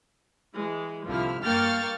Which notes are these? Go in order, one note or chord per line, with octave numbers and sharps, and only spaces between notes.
E3 G#3
C2 D3 F3 E4 F6
G2 A#3 G5 C#6 F6 A6